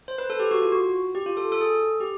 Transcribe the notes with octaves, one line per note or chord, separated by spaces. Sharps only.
C5
B4
A4
G4
F#4
F4
F#4
G4
F4
A4
A4
G#4
G4